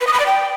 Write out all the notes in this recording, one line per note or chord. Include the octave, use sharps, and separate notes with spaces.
B4
D#6
B5
D5
G5